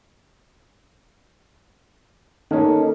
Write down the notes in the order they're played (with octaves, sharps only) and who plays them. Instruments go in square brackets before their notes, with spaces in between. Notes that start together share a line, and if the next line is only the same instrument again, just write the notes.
[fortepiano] D#3 A#3 C#4 [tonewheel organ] D#4 A4